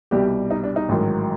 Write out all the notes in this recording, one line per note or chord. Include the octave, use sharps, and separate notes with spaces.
C2 B2 G3 G4
D#4
D4
D#4
A1 G#2 D#3 F#3